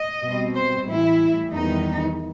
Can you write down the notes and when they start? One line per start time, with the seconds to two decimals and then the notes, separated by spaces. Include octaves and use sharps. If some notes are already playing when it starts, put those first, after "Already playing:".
Already playing: D#5
0.23 B2 G3 C4
0.54 C5
0.86 A2 E3 G3 E4
1.51 E2 D#3 G3 B3 D#4